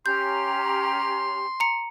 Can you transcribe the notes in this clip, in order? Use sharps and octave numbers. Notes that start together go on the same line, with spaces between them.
C#4 G4 A#5 C6 G6
A#5 C#7